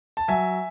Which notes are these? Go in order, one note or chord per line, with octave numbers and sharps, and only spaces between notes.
A5
F#3 E5 G#5